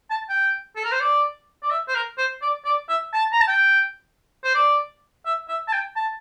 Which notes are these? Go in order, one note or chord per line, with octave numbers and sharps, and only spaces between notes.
A5
G5
A4
A#4
C5
D5
D5
E5
C5
A#4
C5
D5
D5
E5
A5
A#5
A5
G5
C5
D5
E5
E5
A5
G5
A5